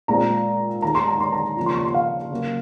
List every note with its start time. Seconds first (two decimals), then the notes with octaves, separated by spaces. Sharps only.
0.08 A#2 G#3 C4 A#5
0.82 D#2 D#3 G#3 A#5
0.95 C6
1.07 A#5
1.20 C6
1.33 A#5
1.57 C#3 F3 A#3 F4
1.66 C6
1.75 C#6
1.85 C6
1.94 F5
2.31 C#3 F#3 A#3